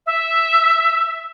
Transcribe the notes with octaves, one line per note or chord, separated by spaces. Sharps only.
E5